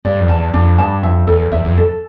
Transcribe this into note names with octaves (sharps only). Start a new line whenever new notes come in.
G2 D5
F2
E2 A5
F2 D4
G2 A5
F2 E5
E2 A4
E2 E5
E2
F2
A4